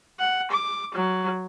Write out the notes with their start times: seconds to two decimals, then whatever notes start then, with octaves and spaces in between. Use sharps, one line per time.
0.19 F#5
0.51 D6
0.95 F#3